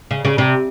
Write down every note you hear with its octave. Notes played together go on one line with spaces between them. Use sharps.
C#3
C#3
C3